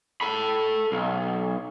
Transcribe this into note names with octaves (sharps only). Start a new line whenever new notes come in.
A4 B5
B1